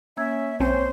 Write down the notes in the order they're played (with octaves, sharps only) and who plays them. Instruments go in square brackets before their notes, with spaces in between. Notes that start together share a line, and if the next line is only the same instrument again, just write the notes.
[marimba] A#3 E6 G#6 [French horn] C#4 [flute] E5
[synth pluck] B1 C4 C#4 [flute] C5 [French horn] C#5